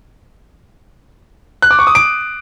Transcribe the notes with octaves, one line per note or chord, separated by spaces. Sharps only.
F#6
D6
C#6
D#6
D7